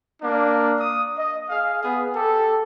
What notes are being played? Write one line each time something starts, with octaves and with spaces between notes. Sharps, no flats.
A#3 D4
D#6
D#5
G#4 F5
B3 G#4
G4 A4